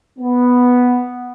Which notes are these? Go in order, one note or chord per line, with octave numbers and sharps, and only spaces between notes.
B3